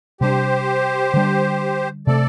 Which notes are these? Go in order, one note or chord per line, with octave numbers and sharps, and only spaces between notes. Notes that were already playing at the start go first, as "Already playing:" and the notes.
C3 G3 D4 G4 C5
D3 G3 D4
C3 A3 C4 A4 D5